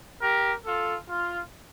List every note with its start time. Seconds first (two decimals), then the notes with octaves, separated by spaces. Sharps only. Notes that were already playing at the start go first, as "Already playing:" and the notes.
0.22 G4 A#4
0.66 F4 A4
1.09 F4